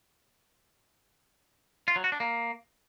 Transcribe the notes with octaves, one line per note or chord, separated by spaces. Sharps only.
F4
F#3
F#4
D4
A#3